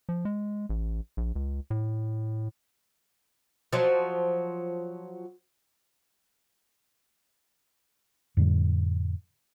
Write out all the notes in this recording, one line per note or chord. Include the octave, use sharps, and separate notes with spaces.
F3
G#3
A1
A#1
C#2
A2
F3 F#3
F2 A2 D3 G3